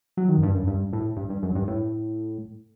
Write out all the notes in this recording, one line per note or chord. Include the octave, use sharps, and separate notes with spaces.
F#3
D#3
F#2
G2
F#2
G2
A2
G2
G2
F#2
G2
A2